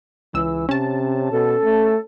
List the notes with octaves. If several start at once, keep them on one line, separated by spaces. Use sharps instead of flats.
C#2 E3 E6
C3 C#4 A5
B2 A4
A3